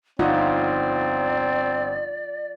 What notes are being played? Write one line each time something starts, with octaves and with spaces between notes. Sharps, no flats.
G1 C4 D#4 F4 D5 F#5